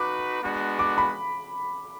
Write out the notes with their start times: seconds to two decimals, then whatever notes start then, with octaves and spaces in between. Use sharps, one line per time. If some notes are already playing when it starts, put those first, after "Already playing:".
Already playing: D#4 F#4 B4 D6
0.42 G#3 B3 D4 F#4
0.79 D6
0.98 B5